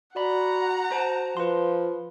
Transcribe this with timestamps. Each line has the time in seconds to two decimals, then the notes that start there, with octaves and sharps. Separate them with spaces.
0.16 F#4 D5 F#5 A#5 B5
0.91 F#4 C5 A5
1.37 F3 B4 C6